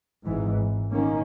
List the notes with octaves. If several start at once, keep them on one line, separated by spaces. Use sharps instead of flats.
G#1 G#2 E3
D#3 A#3 C#4